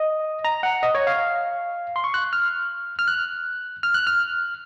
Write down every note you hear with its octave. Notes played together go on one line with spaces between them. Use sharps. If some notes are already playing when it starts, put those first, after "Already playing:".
Already playing: D#5
A#5
F#5
D#5
C#5
F5
C6
C#6
F#6
F6
F6
F#6
F6
F#6
F6